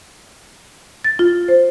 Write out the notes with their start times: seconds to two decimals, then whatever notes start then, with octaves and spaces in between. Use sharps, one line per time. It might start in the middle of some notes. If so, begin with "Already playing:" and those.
1.04 A6
1.19 F4
1.48 C5